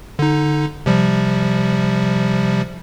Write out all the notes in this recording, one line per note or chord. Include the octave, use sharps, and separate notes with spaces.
D3 D#4
C3 F3 G3